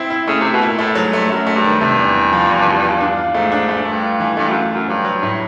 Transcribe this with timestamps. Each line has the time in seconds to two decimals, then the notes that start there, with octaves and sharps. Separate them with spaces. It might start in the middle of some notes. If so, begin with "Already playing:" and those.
Already playing: C4 E4
0.10 E4
0.27 C#3 A3
0.40 C3 E4
0.53 B2
0.61 A#2 E4
0.79 A2 A3
0.95 G#2 F#3
1.12 G2 A3
1.30 F#2 A3
1.47 A3
1.55 G2
1.64 D#3
1.81 G2 C3
1.98 E2
2.15 E2
2.32 F3
2.49 E2
2.66 E2
2.83 F4
3.00 D4
3.17 F4
3.34 G#2 A3
3.52 D4
3.69 A3
3.85 G2 A3
4.03 F4
4.20 E3
4.37 G2 A3
4.49 F#2
4.54 F4
4.71 F#2 F4
4.88 G2 F#3
5.05 F#3
5.23 A2